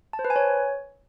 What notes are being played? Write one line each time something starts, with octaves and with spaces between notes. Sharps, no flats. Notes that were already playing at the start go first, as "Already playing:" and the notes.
A5
C5
B4
G#5
C#5